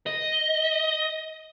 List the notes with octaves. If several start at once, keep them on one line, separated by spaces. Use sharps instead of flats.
D#5